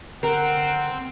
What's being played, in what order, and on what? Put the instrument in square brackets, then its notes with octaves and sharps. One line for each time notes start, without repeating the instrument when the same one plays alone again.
[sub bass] D3 [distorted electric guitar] C4 [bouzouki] A#4 [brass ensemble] F#5